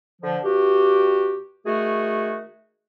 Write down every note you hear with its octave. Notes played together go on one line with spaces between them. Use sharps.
D3 F3
G2 F#4 G4
D#3 A3 F#4 G#4